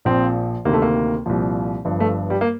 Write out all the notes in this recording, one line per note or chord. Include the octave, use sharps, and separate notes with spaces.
A#1 A#2 F3 C4
D2 C3 D#3 A#3
A3
A#3
C2 A#2 F3
G1 G2 F3
A3
G3
A#3